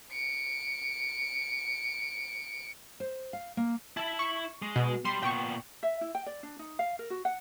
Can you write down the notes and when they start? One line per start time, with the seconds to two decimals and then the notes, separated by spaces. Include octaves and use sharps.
0.11 C#7 D7
3.00 C5
3.33 F5
3.57 A#3
3.97 E4 E5 A5
4.19 C#6
4.62 G#3
4.76 B2
5.05 G3 C6
5.23 A#2 B3 G5 C#6
5.83 E5
6.01 E4
6.15 G5
6.26 D5
6.43 D4
6.59 D#4
6.79 F5
6.99 A#4
7.10 F#4
7.25 F#5